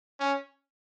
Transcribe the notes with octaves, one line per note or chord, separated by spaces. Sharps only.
C#4